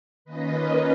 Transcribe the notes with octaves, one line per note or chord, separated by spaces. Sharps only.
D#3 A#3 C#4 F4 B4 D#5